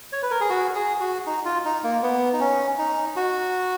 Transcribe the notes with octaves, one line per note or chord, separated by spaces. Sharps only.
C#5
B4
A#4
G#4
F#4
G#4
F#4
D#4
F4
D#4
A#3
B3
D#4
C#4
D#4
F#4